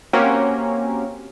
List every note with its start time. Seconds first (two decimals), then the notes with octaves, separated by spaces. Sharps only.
0.13 A#3 C4 C#4 F#4 G4 A#4